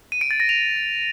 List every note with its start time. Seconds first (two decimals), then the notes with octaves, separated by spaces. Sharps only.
0.12 D#7
0.21 D7
0.31 A6
0.40 A#6
0.49 F7